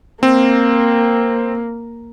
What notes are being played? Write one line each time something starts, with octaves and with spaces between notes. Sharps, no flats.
A#3 C4